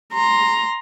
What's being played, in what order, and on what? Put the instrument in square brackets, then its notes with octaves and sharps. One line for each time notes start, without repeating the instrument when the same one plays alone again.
[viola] A#5 C6